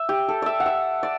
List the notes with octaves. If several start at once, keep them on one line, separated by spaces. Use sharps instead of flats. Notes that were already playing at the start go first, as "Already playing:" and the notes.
Already playing: E5
G4
A4
D5 E5
F#5
E5
D5